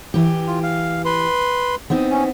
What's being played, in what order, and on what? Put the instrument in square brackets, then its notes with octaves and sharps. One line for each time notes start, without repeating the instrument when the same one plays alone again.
[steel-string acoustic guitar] E3 G4
[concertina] F4
F5
B4 C6
[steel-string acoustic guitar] B3 C4 D#4
[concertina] C#4